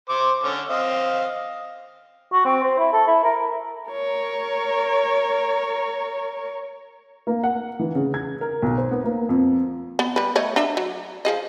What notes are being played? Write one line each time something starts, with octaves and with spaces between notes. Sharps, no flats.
C5 D6
D3 C#4
C4 D#5 F5
F#4
C4
C5
E4
A4
E4
A#4
A#4 C#5
A#3
F#5
E3
C#3
G#6
A#4
B1
C5
B3
A#3
F2
B3
G3 B4
A3 C#5 D#5
D4 E5 A#5
F#3
F3 G#4 D#5